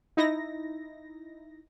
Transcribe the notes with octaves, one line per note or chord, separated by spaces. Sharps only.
D#4 E4 A#6